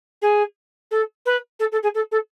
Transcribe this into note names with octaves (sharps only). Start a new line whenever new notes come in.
G#4
A4
B4
A4
A4
G#4
A4
A4